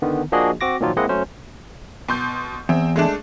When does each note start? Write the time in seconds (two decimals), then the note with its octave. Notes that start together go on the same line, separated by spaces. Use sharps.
0.02 D3 D#3 B3
0.32 F3 A#3 D4 F#4 G#4 D#5
0.61 C4 F#4 D6 A#6
0.80 A#2 D#3 F3 F#3 A#3 F4
0.97 G#3 A#3 C4 E4 D#5 F#5
1.09 F#3 A3 C#4 C5
2.09 B2 C6 G6
2.69 E2 C4
2.96 G#3 A3 D4